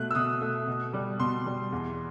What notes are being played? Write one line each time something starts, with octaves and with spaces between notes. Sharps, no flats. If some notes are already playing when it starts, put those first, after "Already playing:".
Already playing: B2 A3 F#6
E6
B2 D#6
A3
B2
G3
B2 C6
G3
E2